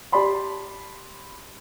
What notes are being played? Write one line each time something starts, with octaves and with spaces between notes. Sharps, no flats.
G4 D5 A5 B5 C6